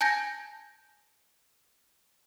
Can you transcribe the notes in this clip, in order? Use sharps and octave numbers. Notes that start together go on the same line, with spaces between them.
G#5 A5 G6 G#6 A#6